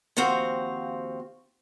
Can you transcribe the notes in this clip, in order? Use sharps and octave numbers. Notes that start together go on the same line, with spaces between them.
D#2 F3 C4 F#4 F5